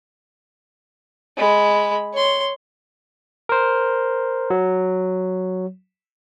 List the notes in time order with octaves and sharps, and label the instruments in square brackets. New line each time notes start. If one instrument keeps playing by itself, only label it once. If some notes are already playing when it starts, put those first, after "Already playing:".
[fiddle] G#3 B5
C#5 C6
[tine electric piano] A#4 C5
F#3